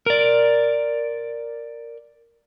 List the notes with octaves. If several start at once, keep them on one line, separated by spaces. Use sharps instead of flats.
A#4 D5